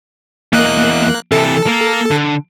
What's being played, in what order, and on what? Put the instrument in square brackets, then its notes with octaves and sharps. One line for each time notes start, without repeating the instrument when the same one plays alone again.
[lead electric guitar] E2 D#5 [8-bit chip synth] A#3 F#6
[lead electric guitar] C3 E3 [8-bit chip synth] A4
[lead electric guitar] A#3 A#4
D3